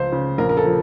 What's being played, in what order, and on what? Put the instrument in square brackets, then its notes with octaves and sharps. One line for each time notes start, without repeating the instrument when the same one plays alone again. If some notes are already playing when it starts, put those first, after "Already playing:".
Already playing: [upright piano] C#2 F3 C5
C#3
A#1 A#4
A#4
A4
F3